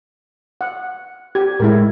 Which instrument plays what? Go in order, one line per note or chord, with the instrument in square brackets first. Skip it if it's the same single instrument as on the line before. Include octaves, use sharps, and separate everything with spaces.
[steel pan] F#5
[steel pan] G4 [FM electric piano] G#6
[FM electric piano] A2 G#3 [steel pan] E4 A#4